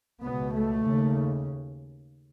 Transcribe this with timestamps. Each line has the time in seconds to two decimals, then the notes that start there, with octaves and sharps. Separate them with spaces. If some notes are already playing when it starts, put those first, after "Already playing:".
0.22 C#2 B2 B3
0.53 A3
0.85 D#2 C#3